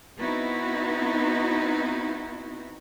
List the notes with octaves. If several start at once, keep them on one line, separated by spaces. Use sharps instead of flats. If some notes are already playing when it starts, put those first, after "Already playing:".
B3 C4 D#4 E4 F#4